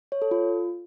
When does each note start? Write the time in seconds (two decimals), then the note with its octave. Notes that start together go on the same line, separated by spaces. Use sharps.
0.12 C#5
0.22 A4
0.31 F4